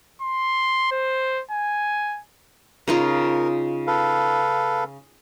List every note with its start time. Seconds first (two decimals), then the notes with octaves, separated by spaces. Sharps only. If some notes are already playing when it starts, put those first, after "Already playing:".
0.22 C6
0.92 C5
1.51 G#5
2.88 C#3 D#4 F4 A#4
3.87 A4 B4 F5